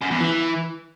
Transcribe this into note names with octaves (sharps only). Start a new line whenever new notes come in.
F#2
E2
E3